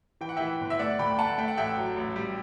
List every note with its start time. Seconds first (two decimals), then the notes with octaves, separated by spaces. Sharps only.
0.21 E3 G5
0.29 F#5
0.36 E3 E5 G5
0.60 G1
0.70 E5
0.79 A3 D5 F#5
0.99 D2 G5 B5
1.19 A3 F#5 A5
1.38 A3 G5
1.48 F#5
1.57 A1 E5 G5
1.77 F#3
1.97 A1
2.16 G3